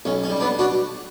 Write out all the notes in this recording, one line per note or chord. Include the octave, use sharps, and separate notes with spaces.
B1 C#4
C#4
G3
B3 D4
D4 F#4